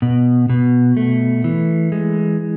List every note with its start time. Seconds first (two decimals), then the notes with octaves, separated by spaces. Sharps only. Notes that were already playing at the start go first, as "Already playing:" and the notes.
0.02 B2
0.50 B2
0.97 A3
1.44 E3
1.92 G#3